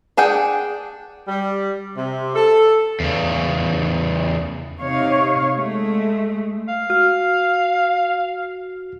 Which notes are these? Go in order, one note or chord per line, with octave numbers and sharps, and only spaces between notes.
D4 G#4 F#5 G5
G3
C3
A4
E2 C#3
C3 D#4 C#5 F5
G#3 A3
F5
F#4 F6